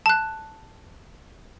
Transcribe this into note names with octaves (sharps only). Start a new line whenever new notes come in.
A5 F#6